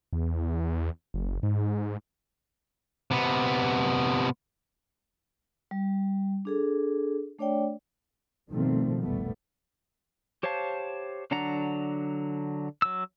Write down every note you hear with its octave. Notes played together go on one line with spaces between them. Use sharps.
E2
F#1
G#2
C3 B3
G3
D4 G#4 A4
A3 D4 C#5 D5 G5
B2 D#3 F3 G3 A3 C4
F1 A#1 A2 G3 A3 B3
G4 C5 C#5 F5 A5
D3 F#3 D4 F#5 A#5
F#3 E6